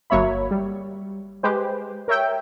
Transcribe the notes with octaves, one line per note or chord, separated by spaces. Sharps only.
G1 F#3 A#3 C#5 E5 B5
G3
G#3 G4 B4 C5
A#4 C#5 E5 G5